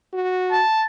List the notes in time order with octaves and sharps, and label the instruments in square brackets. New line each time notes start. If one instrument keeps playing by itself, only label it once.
[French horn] F#4
[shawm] A5